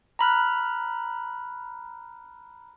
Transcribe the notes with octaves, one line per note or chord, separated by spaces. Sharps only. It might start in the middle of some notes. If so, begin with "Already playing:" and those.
A#5 B5 F6 F#6